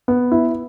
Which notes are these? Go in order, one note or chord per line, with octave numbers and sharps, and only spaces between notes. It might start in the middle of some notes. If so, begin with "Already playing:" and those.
B3
E4